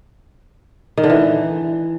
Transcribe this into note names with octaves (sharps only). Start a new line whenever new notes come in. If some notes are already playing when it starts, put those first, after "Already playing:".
D#3
D3
E3